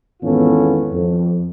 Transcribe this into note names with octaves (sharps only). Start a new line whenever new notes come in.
G#1 E2 B3 C#4 F4 A4
F2